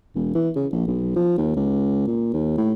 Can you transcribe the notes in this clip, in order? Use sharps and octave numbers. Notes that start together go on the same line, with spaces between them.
E1
E3
C#3
A#1
B1
F3
D#2
C#2
A#2
D#2
A2